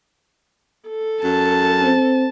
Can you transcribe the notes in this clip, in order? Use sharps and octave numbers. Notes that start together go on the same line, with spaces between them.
A4
F#2 A5
C4